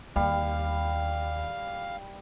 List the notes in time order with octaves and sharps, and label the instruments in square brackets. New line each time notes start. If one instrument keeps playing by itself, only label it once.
[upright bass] D#2 [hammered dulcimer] G3 [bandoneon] F5